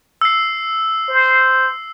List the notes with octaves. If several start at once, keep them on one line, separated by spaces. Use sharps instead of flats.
E6 C7
C5